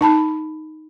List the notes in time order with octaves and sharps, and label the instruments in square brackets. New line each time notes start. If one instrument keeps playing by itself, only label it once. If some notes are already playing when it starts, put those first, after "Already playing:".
[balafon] D#4 A5 B5